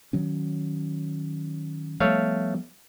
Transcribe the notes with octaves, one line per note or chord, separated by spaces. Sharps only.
D#3 F#3 C#4
F3 G3 A3 B3 C#5 F5